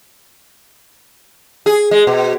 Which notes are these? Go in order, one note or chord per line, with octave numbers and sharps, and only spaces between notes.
G#4
G#3
B2